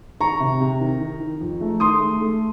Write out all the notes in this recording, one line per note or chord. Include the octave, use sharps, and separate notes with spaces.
D#3 A#5 C#6
C3
C3
D#3
D#3
D#3
F2
A3
D#3 C6 D#6
A3
A3